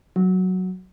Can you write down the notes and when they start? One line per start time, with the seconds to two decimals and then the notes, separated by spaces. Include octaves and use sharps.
0.16 F#3